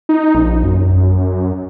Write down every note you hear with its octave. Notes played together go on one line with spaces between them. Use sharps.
D#4
A#1
F#2